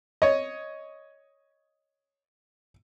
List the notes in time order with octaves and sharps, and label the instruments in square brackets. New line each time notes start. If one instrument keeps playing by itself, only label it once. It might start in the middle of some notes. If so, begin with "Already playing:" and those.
[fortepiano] C#5 D#5